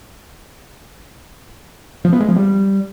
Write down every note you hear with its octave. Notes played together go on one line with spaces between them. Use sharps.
F3
B3
G#3
F3
G3